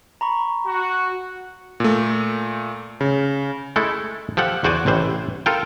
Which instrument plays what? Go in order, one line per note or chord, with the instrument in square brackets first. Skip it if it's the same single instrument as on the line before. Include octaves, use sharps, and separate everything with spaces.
[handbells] A#5 B5 C#6
[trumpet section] F#4
[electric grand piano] A#2 A3
C#3
[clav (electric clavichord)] G#3 A3 E4 A4
F3 G4 A4 F#5
E2 F#4 C5 D5 G#5
A1 C3 E3 C5
F4 A4 A#4 G5